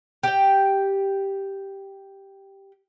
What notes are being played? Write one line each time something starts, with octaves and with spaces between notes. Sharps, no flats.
G4 G5